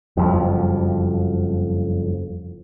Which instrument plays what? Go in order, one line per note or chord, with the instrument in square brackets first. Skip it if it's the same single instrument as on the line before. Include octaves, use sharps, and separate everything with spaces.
[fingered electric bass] F#1 F2 F3 G3